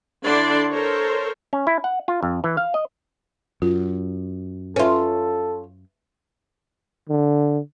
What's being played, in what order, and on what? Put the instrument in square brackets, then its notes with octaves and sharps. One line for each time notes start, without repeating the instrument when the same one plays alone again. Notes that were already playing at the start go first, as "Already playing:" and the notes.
[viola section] D3 D4 E4 D5 C6
A4 A#4 C5 C#5
[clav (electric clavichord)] C#4
E4
F#5
F4
F2
E3
F5
D#5
[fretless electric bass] F#2 [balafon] F4
[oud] C#4 F4 [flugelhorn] A4 [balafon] B4 E5
[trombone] D3